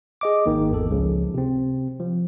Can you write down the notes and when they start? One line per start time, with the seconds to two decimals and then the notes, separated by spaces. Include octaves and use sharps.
0.21 G#4 D#5 D6
0.46 G#1 D#3 A#3
0.71 G#1 E2 A4
0.91 C#2 C#3 F3
1.34 C3 C4
2.00 F3